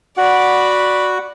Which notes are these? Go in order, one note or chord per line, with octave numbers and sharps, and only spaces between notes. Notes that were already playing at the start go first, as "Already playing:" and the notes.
F#4 D5 F#5 B5